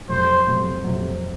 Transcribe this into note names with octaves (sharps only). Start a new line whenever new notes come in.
F2 C3 F#3 C5
F2 C3 F#3
F2 C3 F#3